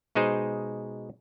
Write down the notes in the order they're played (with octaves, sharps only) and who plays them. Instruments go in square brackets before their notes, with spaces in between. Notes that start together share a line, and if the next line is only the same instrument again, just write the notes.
[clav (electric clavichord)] B2 G#3 D#4 G#4 C5